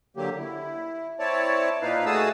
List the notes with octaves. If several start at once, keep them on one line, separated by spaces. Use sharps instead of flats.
D3 F#3 A#3 G4
E4
C4 E4 C#5 D5 A5
A#2 D#4 B4 F5
A3 F#4 G#4 A5 D#6 E6